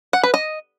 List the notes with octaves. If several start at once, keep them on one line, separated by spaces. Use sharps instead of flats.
F#5
B4
D#5